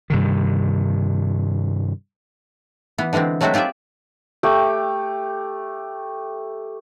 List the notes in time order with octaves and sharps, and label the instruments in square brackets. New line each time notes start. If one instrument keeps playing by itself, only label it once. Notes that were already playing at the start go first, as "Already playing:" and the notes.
[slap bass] G2 C3 D#3
[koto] E3 B3
D3 E3 G#3 B3 C4
F#3 G#3 A3 C4 E4 F#4
F4 G4 G#4 D5 E5
[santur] A3 G4 G5